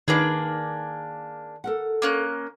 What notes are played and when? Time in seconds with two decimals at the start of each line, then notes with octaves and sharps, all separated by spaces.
0.08 D#3 A#3 D4 G#4 B4
1.64 A4 A#4 F#5
2.02 A#3 C#4 F#6